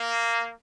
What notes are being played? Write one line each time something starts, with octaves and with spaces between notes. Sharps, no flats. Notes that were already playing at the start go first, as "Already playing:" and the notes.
Already playing: A#3